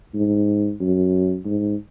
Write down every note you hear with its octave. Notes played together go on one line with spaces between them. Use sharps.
G#2
F#2
G#2